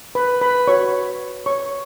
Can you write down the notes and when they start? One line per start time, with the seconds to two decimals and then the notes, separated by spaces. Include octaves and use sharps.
0.15 B4 B5
0.41 B4 B5
0.67 F#4 B4 C#5 C#6
1.46 C#5 C#6